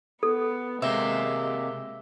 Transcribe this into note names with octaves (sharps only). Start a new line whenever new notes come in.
B3 A4
C3 G#3 A#3 G4 E5